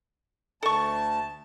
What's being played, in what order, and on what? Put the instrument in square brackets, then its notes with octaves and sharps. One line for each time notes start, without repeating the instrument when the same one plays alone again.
[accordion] D2 A5 [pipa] A4 C#6